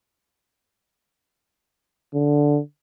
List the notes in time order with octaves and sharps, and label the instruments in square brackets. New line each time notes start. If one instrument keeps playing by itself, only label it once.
[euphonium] D3